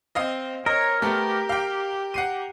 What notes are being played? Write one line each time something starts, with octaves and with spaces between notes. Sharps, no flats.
C4 D#5 F5 D#6
A#4 C#5 D#5
A3 B3 G4
F5 G5
F#5 C7 D#7